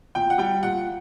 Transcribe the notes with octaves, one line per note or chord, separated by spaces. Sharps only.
A#2 G5
F#5
G3 G5
A#2 F#5